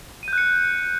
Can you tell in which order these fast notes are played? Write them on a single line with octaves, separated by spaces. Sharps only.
D#7 G6 F#6 C#7